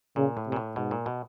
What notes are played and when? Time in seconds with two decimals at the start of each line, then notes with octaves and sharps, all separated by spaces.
0.16 A#2 C#3
0.37 A2
0.47 C3
0.52 A#2
0.56 A2
0.76 G#2 B2
0.91 A#2
1.06 B2